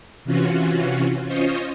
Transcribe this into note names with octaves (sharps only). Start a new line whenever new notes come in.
C3 E3 C#4 F4 F#4
C#4 F4 C5 C#5 D#5